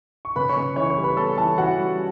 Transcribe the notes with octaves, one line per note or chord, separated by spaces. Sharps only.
C#6
C#3 B4 B5
C#5 C#6
C#3
E3 C#5 C#6
C#5 C#6
G3
B4 B5
B3 A4 A5
E3 A4 A5
E3 F#4 F#5
G3